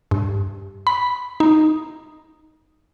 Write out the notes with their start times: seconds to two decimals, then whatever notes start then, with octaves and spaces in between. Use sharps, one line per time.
0.11 G2
0.87 B5
1.40 D#4